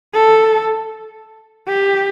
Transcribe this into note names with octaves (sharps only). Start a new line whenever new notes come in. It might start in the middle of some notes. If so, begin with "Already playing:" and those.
A4
G4